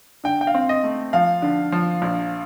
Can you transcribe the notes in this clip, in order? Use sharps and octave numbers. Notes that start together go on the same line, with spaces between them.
D3 G5
G5
F5
C4
D#5
A3
F3 F5
D3
F3
A#1